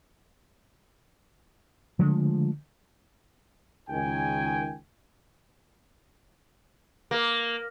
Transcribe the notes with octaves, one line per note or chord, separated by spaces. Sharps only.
D3 F3 G#3 A3
C#2 D#3 G5 G#5
A#3